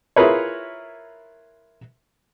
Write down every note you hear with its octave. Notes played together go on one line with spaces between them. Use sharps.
E4 F4 G#4 A#4 B4 C#5